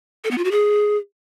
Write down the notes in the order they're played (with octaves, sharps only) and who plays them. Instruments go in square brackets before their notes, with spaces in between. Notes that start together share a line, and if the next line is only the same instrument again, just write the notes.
[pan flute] A4
B3
F4
F#4
G#4